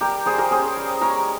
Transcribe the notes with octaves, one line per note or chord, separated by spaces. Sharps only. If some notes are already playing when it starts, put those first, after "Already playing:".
G3 G4 A#4
G3 G#4 C5
G4 A#4
C#4 G#4 C5
G3
G#3 A#4 C#5